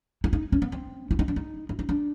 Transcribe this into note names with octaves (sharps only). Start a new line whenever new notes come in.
E4
D#4
C#4
B3
C4
E4
D#4
D4
D#4
E4
D#4
D4